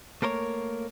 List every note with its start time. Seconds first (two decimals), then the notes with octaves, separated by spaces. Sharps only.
0.22 A3 A#3 A#4 C5 C#5